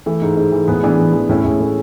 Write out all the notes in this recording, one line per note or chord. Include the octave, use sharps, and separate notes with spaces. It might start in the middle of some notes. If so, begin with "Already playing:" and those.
E3 A3
G#2
G#2
E3
A2 G#3 B3
E3 B3 D4
E3
E3
A2 C#4 E4
A2 G#3
A2 A3